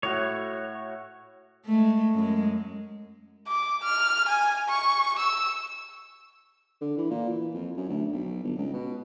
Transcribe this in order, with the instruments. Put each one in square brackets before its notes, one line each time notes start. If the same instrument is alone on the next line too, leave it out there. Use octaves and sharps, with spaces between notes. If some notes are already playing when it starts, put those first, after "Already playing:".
[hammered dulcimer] A2 F#4 [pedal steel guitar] C#5
[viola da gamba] G#3 A3
F#2 G#3
[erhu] D6
F6
G#5
C#6
E6
[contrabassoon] D3
E3
A#2
E3
F2
F#2
D2
B1
G1
C#2
B2